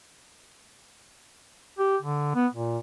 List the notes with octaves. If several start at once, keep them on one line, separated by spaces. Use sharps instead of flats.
G4
D3
B3
A#2